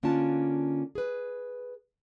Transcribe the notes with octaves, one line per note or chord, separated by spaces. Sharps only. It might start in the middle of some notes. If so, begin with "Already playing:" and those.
D3 A#3 C#4 D4 F4 A5
G#4 B4